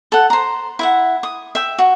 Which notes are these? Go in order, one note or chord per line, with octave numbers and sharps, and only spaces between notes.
A4 F#5
C5 A#5
E4 E5 F#5
D#6
E5 G5
F#4